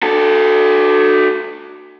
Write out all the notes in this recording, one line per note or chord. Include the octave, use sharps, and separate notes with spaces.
F#4 A4